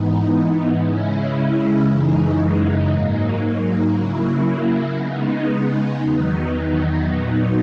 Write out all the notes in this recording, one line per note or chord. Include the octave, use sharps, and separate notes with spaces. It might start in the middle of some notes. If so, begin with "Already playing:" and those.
Already playing: G#2 E3 B3 D#4
C#3 G#3 C#4 E4
F#2 C#3 E3 G#3 D#4
G#2 F#3 A#3 D#4
C#3 F#3 A#3 E4
C#3 G#3 B3 D#4
E2 D#3 F#3 B3 D#4
A#2 F#3 B3 D#4